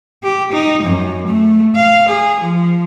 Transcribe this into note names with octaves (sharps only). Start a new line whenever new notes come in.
G4
D#4
F#2
A3
F5
G#4
F3